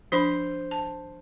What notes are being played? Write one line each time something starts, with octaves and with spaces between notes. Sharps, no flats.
F3 D4 C5 B5
A5